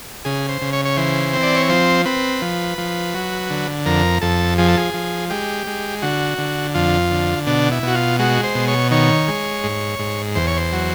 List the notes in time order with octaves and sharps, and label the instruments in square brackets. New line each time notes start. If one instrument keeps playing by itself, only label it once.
[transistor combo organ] C#3 G#4
C5
C#3
C#5
C#5
E3 C5
C4
D5
C#5
F3 C5
C4 B4
F3
F3
F#3
D3
F2 A#4
F2 A4
F3 G#4
A4
G#4
F3
G#3 G4
G#3
D3 F#4
D3
F2 F4
D3
B2 D4
E4
B2 F#4
F4
G#3 F#4
C5
B2
C#5
D#3 C#5
G#3
G#2
G#2
E2 C5
C#5
C5
F#3